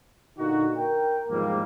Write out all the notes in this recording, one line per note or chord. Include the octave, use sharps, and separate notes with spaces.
A#2 D3 A#3 D#4 F#4
A#4 G5
E2 G#2 D#3 F3 G3 A#3